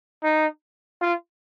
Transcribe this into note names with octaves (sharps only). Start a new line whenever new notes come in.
D#4
F4